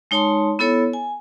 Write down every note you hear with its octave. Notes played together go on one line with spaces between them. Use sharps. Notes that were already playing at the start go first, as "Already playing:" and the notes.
G#3 D#4 C#5 A5 C6
B3 E4 A4 C#5
G#5